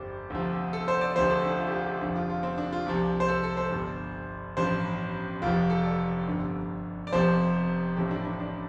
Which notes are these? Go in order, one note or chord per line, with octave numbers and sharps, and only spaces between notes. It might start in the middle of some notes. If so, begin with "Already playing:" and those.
Already playing: G1 F2 F3 G4 C5
D2 C3 F3
A4
C5
D5
D2 C3 F3 C5
A4
D4
F4
G4
F4
G4
F1 F2 D3 F3 D4
F4
F4
C4
D4
F4
C2 C3 F3
C5
A4
A4
C5
G1 G2 F3
A1 G2 F3 C5
F1 F2 F3 F4
A4
D5
G1 G2 D3 F3
D5
F1 F2 C3 F3 C5
A1 A2 F3 G4
D4
D4
D4